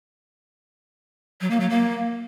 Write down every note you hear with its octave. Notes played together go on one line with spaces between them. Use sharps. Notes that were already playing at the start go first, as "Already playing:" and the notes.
F#3
A#3
F#3
A#3